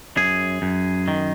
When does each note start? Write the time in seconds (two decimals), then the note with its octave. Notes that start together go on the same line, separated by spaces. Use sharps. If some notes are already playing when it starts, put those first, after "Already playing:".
0.17 F#2 G#4
0.62 F#2
1.08 D#3